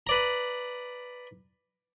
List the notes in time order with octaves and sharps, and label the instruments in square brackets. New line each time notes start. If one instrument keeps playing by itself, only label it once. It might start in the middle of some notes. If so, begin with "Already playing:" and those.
[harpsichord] B4 D5 A#5